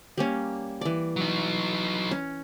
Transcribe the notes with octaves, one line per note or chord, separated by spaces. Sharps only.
G3 A#3 C#4
E3 D5
F#3 D#4
C#4